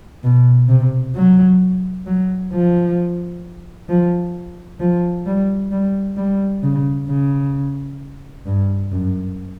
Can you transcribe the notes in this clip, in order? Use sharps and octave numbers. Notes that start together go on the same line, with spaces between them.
B2
C3
F#3
F#3
F3
F3
F3
G3
G3
G3
C#3
C#3
G2
F#2